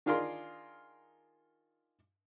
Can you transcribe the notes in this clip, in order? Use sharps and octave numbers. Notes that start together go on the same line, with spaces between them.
D#3 D4 F4 G#4 A#4 C6